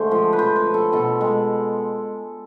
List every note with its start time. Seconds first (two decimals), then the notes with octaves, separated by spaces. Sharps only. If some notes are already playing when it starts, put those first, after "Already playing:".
Already playing: D3 G#3 A3 C5
0.11 F3
0.33 B4
0.38 F3 C5
0.56 B4
0.66 F3
0.74 A4
0.92 B2 A4
1.21 G#3